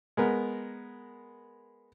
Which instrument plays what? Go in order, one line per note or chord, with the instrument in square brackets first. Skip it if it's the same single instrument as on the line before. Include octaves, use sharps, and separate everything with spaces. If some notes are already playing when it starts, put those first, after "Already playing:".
[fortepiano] G#3 B3 A#4